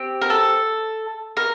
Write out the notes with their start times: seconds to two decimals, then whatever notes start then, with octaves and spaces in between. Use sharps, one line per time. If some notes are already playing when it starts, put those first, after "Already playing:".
Already playing: C4 G4
0.22 A#4
0.30 A4
1.37 A#4